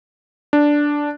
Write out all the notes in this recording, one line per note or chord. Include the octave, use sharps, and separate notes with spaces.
D4